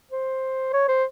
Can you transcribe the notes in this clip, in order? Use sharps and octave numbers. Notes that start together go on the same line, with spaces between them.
C5
C#5
C5